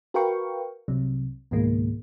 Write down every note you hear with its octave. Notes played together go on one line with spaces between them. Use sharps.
F#4 A#4 B4 F5 G5 C#6
C2 C3 F#3
C#2 G#2 B2 D#3 G#3 A#3